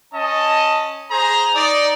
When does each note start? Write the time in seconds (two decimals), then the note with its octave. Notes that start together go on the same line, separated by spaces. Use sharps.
0.14 C#4 D#5 A5
1.11 G#4 C5 A#5
1.55 D#4 D5